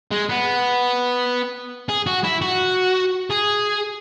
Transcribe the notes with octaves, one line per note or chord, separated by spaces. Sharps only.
G#3
B3
G#4
F#4
E4
F#4
G#4